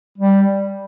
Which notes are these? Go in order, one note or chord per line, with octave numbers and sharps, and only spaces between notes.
G3